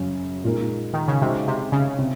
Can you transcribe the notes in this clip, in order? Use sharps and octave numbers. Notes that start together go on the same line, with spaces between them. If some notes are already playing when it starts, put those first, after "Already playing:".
Already playing: F#2 C#3 F#3 C#4
A#2 G#3 D#4 A#4
D#3
C#3
C3 G#3 D#4 F#4 C5 D#5
C3
C#3
C3